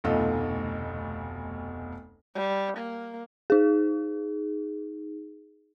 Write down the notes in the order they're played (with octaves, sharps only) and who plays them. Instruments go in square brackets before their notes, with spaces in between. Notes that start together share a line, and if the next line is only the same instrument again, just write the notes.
[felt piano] F1 D2 B2 F4 A4 D#5
[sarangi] G3
A#3
[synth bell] D#4 G#4